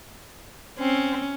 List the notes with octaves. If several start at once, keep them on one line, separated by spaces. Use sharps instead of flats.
C4 C#4